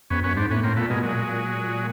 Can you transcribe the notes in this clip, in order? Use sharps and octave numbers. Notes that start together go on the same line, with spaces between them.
F2 B3 C#4
F#2 B3 C#4
G#2 C4 D4
A2 B3 C#4
A2 A#3 C4
A#2 A3 B3
B2 G#3 A#3
A#2 F#3 G#3